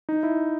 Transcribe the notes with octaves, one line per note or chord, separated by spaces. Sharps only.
D#4
E4